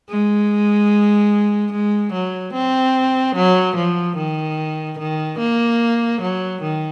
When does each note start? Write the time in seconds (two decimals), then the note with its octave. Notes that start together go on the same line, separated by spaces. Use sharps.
0.09 G#3
1.72 G#3
2.13 F#3
2.53 C4
3.35 F#3
3.76 F3
4.16 D#3
4.98 D#3
5.39 A#3
6.21 F#3
6.62 D#3